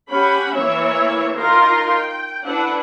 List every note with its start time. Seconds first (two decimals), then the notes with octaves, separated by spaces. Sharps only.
0.11 C#4 G4 F#5 B5
0.56 E3 A#3 E4 C#5 E5
1.36 D#4 F4 A#4 A#5 C6
1.92 G5
2.44 D4 E4 B4 F#5